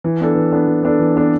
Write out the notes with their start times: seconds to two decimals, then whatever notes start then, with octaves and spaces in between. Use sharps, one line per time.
0.04 E3
0.20 B3 D4 A4
0.35 E3
0.51 B3 D4 A4
0.68 E3
0.83 B3 D4 A4
0.99 E3
1.16 B3 D4 A4